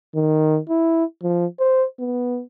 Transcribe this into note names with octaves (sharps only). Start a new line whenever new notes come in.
D#3
E4
F3
C5
B3